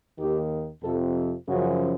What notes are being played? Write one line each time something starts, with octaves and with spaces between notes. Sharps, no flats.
D#2 D#3 G4
F2 C3 F3 A4
F#2 C#3 F3 F#4